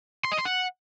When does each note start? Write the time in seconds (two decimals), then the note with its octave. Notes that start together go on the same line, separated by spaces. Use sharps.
0.25 C6
0.32 D#5
0.38 C6
0.45 F#5